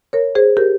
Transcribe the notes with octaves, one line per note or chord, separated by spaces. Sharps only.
A#4 C#5
G#4 C5
G4 A#4